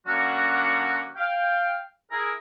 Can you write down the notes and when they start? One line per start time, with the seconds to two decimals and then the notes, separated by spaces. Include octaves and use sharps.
0.07 D3 F#3 A#3 C#4 D4 F#4
1.16 F5 G5
2.11 E4 G#4 A#4